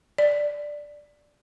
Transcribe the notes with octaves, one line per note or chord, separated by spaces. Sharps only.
D5